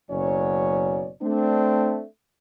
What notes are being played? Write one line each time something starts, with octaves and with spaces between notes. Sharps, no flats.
F#1 B2 F#3 C#4 C#5 D5
A3 C4 D4